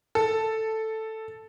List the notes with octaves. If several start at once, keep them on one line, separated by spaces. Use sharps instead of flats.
A4